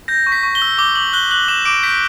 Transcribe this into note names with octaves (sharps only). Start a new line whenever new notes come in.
G6 A#6
C#6
B6
C#6
G7
E6
D6 G7
D6 F#7
F#6 G7
F#6 F#7
D6 E7
D6 D7
G6 B6